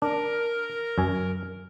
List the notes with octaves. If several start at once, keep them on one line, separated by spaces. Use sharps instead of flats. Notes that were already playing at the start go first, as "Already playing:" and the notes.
D4 A#4
F#2 G#5